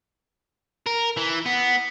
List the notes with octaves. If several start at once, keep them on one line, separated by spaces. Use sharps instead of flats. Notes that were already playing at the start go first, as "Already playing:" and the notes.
A#4
E3
B3